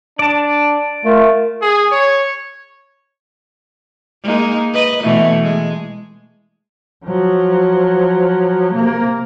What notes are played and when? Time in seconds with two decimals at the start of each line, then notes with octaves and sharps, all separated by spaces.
0.19 D4 D5 A5
1.05 A3 F4 A#4
1.61 G#4
1.92 C#5
4.23 G#3 A#3 D#4
4.74 B4 D#5
5.03 B2 E3 A3
5.43 G#3
7.05 F3 F#3
8.74 C3 A#3